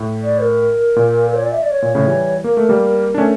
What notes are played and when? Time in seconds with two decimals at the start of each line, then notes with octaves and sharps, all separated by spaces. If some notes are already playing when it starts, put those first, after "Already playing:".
Already playing: A2
0.23 D5
0.41 A#4
0.96 A#2
1.28 A#4
1.34 C#5
1.43 D5
1.52 E5
1.62 D5
1.71 C#5
1.82 A#2
1.95 A2 C#3
2.07 E3 G3
2.44 A#3 A#4
2.57 A3
2.69 G3 A#3
3.14 D4
3.18 A3 C#4